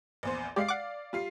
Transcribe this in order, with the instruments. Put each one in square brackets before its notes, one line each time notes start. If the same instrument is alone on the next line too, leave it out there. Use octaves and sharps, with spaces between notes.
[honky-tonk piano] A#1 E2 C5
[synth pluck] G#3 G4 [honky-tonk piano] D5 F5 C7
[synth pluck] F#5 D6
[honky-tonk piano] G3 F4 C7